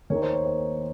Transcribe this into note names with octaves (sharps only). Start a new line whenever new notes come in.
D#2 D#3 A#3 D#4 C#5
C5
C#5
C5